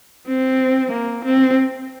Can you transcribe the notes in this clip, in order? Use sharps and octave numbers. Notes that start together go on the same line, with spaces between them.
C4
A#3
C4